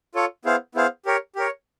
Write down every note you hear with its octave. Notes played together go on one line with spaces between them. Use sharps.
F4 A4 C#5
B3 E4 G#4 C5 F5
B3 E4 G#4 C5 F5
G4 A#4 C#5
G4 A#4 C#5